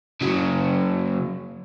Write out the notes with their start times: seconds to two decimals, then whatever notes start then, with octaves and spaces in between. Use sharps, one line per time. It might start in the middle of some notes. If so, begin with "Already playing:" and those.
0.21 C#3 F#3